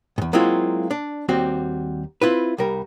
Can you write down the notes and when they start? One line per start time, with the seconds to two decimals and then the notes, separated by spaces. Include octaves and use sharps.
0.18 E2 G#2
0.33 F#3 G#3 A#3 C4 E4 F4
0.91 D4
1.29 D#2 G3 C4 F#4
2.22 C4 E4 F4 B4
2.58 C2 G3 A#4